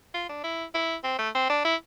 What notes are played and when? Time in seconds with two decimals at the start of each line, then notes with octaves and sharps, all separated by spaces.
0.14 F4
0.29 D4
0.43 E4
0.75 E4
1.04 C4
1.19 A3
1.35 C4
1.50 D4
1.65 E4